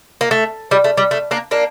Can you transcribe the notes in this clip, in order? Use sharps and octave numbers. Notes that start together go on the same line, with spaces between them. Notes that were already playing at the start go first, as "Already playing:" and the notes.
A#3
A3
G3
A3
G3
A3
A#3 D4
A#3 D4